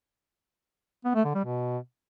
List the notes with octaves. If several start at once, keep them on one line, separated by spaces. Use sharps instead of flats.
B3
A3
D3
G3
B2